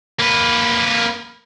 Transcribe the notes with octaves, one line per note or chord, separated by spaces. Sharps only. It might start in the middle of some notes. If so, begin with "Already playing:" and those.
A#3 B4